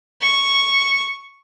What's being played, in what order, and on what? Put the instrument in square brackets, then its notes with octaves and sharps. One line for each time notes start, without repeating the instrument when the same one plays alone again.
[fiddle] C#6